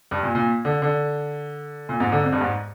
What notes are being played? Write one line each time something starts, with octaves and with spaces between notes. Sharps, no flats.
G2
A#2
A#2
D3
D3
A#2
G#2
D3
F2
G2
G#2